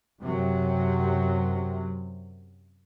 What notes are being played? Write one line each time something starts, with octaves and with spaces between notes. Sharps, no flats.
F#2 C3 F#3